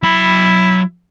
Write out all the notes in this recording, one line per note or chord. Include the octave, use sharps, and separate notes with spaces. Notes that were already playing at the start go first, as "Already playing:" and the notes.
F#3 E4 B5